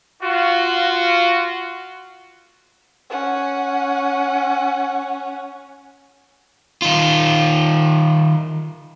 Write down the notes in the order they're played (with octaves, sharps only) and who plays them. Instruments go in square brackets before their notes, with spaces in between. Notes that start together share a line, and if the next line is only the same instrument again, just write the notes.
[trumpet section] F4 F#4
[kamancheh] C#4 F#5
[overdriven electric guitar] D#3 F4